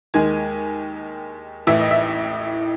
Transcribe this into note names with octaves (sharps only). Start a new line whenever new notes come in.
D#2 D#3 G#3 G#5
A1 A2 E3 E5
D#5
E5